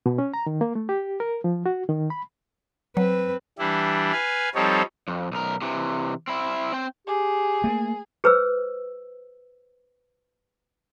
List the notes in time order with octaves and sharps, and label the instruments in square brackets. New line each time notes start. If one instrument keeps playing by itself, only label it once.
[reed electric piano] B2
C#4
A#5
D#3
A#3
A3
G4
A#4
F3
F#4
D#3
B5
[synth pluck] F#3 [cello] C4 B4
[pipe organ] E3 G3 D4 E4
B4 F5 G#5
F3 G3 C4 D#4 A4 C#5
[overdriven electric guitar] F2
B1 A#4
C3 E3
C4 E4
C4 G5
[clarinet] G4 [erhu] G#4
[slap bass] A3 A#3
[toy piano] G#4 B4 C5 E6